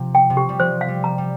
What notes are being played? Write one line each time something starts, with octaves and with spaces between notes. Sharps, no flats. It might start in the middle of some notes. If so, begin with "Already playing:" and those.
Already playing: C3 F3
G5
C3
G4
G3
F3 C5
F5
G3
A#5
G3